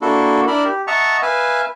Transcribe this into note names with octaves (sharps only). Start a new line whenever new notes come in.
A#3 D4 E4 F#4 A4
D4 E4 A#4 D5 B5
G4
D#5 E5 F#5 A5 A#5 C#6
B4 E5 F5 G#5